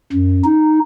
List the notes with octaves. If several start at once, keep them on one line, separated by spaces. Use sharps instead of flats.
F#2
D#4